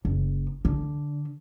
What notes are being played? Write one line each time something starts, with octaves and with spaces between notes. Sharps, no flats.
F#1
D3